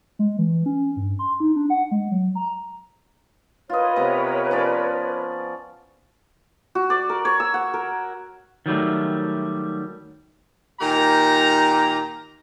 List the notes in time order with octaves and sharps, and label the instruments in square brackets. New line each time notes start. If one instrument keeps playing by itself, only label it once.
[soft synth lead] G#3
E3
C#4
G2
C6
D#4
D4
F#5
G#3
F#3
A#5
[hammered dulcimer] F4 D#5 [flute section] A#4 B4 C#5
[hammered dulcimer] C3 B3 A#5
F3 C#4 D5
[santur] F#4
D5
A#4
C#5
E6
F#5
A#4
[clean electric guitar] D#3 F#3 G3 A3
[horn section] A#2 D#3 G4 A#5